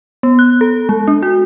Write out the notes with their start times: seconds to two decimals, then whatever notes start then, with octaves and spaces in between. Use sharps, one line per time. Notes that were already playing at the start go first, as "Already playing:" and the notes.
0.23 B3
0.39 F#6
0.61 A4
0.89 G#3
1.08 D4
1.23 F#4